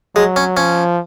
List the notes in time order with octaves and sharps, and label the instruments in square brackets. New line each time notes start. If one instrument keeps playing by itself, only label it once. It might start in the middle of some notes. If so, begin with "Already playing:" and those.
[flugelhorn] F#3 [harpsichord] G#3
[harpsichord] C#4
[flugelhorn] F3 [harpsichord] C#4